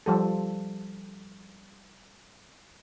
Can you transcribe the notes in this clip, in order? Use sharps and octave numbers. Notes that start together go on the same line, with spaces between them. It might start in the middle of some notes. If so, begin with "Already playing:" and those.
F3 G3 A4